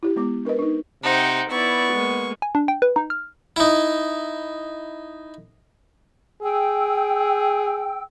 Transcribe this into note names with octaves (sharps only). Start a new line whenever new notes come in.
E4 G4
G#3 B3 D6
D4 A#4 B4 D#5
D4 D#4
C3 D#4 C5 F#5 G5
B3 E4 D5 C#6
G#3 A#3
G#5
D4
G5
B4
D#4
F6
D#4 E4
G#4 G5 E6